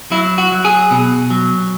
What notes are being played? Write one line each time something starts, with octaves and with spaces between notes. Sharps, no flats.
F#3 E4
F#4
F#3
G#4
B2
F#3